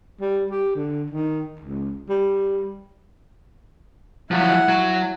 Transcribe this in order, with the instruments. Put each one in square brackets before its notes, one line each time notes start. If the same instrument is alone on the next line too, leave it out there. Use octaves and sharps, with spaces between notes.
[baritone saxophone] G3
G4
D3
D#3
C#2
G3
[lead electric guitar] F3 F#3 [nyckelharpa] E4 F#5
[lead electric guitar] F#3